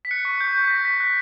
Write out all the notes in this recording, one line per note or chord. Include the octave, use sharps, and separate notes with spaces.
B6
F#6 C#7
C#6
C#6 G6
C#6
B6
G6 A#6
C#6 B6
F#6